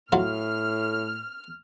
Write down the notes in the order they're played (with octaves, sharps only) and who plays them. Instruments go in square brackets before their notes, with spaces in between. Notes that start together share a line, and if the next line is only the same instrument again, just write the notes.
[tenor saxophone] A2 [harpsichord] F#3 F4 [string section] F6